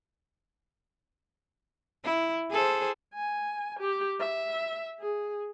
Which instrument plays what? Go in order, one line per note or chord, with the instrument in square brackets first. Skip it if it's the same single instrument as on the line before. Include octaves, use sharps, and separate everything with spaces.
[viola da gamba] E4
G#4 A4 C5
[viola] G#5
G4
E5
G#4